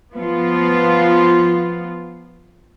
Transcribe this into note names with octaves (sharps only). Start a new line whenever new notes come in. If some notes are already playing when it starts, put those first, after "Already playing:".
F3 B3 F4